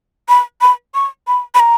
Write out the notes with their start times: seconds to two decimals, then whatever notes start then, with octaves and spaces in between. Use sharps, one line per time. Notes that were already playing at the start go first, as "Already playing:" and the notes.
0.29 B5
0.61 B5
0.94 C#6
1.27 B5
1.54 B5
1.60 A#5